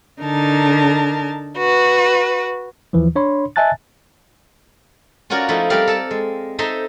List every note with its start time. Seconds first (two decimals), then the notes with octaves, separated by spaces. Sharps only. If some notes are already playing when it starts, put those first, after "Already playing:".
0.22 D3 D#4 A#4 A5
1.57 F#4 B4
2.93 D#2 E3 F3
3.16 D4 C#5 B5 C6
3.56 D#5 E5 G#5 A5 F#6 A6
5.30 C#4 F4 F#4 A#4 C#5 D5
5.49 F3 A3 D#4 E4
5.70 G3 C4 A4 A#4 D5 F5
5.87 A4 A5
6.11 G#3
6.59 D#4 A4 C5 E5 A#5 C6